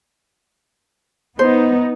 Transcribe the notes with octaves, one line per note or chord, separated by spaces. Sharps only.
B3 D#4 C5